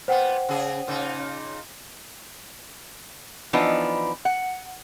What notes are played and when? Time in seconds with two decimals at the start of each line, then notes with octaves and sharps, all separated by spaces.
0.08 A#2 B3 C5 F#5 G5
0.49 C#3 G#4
0.87 A#2 C#3 D#4
3.53 E3 F3 B3 D4 D#4 B4
4.25 F#5